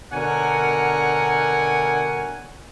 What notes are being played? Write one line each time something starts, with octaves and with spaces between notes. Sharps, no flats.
B2 D3 A#4 C#5 F#5 G#5